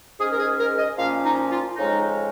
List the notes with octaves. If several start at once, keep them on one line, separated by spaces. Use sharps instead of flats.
G#2 G#3 C#4 G#4
A#4
G#4
A#4
D#5
A#2 F3 A#3 C#4 F5
D#4
F4
F2 C#3 G#3 C#4 D#4